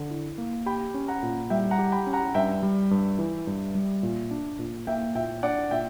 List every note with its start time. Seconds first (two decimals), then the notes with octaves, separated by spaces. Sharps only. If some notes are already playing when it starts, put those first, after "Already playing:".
Already playing: D3
0.10 E4
0.38 A#3
0.66 G4 G5 B5
0.94 C#4
1.08 F#5 A#5
1.23 A#2
1.50 G3 E5 G5
1.71 F#5 A#5
1.79 G4
1.92 G5 B5
2.07 C#4
2.13 F#5 A#5
2.35 G2 E5 G5
2.63 G3
2.91 G2
3.19 E3
3.47 G2
3.75 G3
4.03 A#2
4.31 D4
4.59 A#2
4.87 A#3 E5 G5
5.15 A#2 E5 G5
5.43 D4 D5 F#5
5.71 A#2 E5 G5